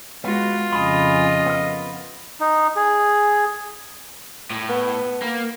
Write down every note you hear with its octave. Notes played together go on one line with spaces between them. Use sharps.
G#3 B3 F4 F#4
F2 C#3 D#5 G#5 B5
B3 A#4
D#4
G#4
A2
B3
A#3